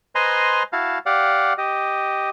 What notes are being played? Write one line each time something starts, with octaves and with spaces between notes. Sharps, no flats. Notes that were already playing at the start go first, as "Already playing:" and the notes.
B4 C5 D#5 G#5 A#5 C6
E4 F#4 F5 A5
G4 D5 F5 F#5
G4 D#5